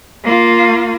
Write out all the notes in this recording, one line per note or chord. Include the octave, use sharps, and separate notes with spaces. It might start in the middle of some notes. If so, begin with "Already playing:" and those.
A#3 F4